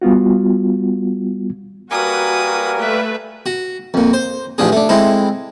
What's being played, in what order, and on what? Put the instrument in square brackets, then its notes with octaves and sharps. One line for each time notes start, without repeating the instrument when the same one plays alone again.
[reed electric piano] G3 B3 F4 F#4
[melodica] G3 A#3 A#4 [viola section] F#4 [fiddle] B4 D#6 [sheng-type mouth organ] G#5
[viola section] A3 B4 [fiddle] E5
[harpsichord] F#4
F2 A#2
C5
A1 F3 D4 G#4
A3 D4
G#3 C4 E4 A4